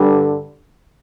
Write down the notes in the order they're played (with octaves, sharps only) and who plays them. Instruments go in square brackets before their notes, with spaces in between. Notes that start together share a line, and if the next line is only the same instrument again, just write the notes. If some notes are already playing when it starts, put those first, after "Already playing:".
Already playing: [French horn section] G2 D3 G3